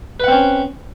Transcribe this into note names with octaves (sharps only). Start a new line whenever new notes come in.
C4 C#4 B4 F#5